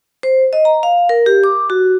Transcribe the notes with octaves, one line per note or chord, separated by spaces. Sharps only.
C5
D#5
A#5
F5
A#4
G4
D6
F#4